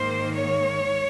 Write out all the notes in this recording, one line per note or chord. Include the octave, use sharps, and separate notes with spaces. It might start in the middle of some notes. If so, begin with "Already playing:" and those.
Already playing: G#2 D#3 A#3 C5
C#5